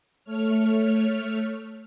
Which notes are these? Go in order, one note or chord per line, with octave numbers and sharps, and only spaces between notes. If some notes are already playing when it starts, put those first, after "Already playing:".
A3 C#5 F6